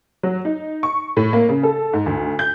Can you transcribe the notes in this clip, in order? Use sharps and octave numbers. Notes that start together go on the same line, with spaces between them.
F#3
D#4
C#6
A2
A#3
C#3
A4
G#2
D2
G6